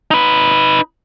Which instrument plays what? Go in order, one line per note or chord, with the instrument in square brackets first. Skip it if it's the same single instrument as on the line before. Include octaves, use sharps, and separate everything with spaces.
[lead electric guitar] D#4 B4